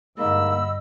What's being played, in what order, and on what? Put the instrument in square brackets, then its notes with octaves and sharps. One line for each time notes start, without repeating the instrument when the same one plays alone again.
[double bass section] G2 [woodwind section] D3 B5 E6 [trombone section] G#3 A#3 D#4 [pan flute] D#5